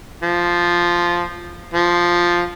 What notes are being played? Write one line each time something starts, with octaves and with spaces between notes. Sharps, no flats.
F3
F3